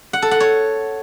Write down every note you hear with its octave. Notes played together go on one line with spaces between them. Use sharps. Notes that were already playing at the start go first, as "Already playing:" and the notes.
F#5
A4
F#5
C#5